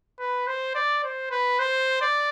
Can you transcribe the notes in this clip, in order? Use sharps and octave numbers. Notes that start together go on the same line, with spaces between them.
B4
C5
D5
C5
B4
C5
D5